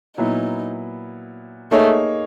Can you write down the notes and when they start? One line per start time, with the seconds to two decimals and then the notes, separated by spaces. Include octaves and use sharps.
0.17 A#2 F#3 B3 D#4 E4
1.71 A3 A#3 D#4 G#4 C#5